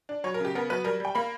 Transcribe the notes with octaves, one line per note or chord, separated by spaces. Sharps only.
D4
F#3 C#5
A#4
C#3 G4
B3 A#4
F#3 B4
G3 A#4
G3 G5
A#3 B5